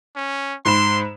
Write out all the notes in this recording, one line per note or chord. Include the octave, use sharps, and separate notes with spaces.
C#4
G#2 B5 C6 E7